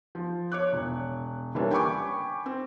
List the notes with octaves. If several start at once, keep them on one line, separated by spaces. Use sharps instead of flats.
F3
C#5 D6 F#6
E1
D3 E3 G3 A#3 C#4 D4
G5 G#5 B5 C#6 D6
C4